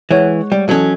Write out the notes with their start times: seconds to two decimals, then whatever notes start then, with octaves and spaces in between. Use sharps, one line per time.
0.11 E3 G#3 C#5 F#5
0.52 G3
0.69 E3 F#3 C#4 A4 D#5